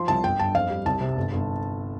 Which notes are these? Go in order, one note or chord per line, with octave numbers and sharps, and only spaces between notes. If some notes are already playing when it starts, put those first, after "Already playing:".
Already playing: F3 C6
C2 A5
G1 G5
G2 A5
F2 F5
G3
C2 A5
C3
G1
G1